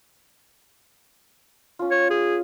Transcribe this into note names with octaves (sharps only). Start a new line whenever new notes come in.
C#4 F4
C#5
G#4